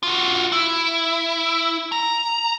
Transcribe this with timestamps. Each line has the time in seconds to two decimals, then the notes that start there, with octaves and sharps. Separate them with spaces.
0.03 F4 F#4
0.52 E4
1.92 A#5